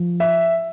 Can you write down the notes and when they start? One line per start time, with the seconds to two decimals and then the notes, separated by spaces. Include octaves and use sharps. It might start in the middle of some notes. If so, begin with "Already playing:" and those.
Already playing: F3
0.20 E5